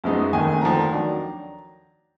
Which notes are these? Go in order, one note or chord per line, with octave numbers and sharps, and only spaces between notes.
F#2 F3 G#3 B3 D#4
F1 D#2 D#3 G#5
F1 D#2 D3 F3 A#5
D#3 F#3 D4